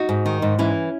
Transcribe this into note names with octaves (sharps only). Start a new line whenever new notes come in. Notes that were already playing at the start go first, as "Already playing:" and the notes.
Already playing: D#4 F#4
G#2
D#3
G#2
E3 C#4 E4